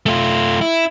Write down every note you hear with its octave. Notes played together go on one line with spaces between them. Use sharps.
A3 F4
E4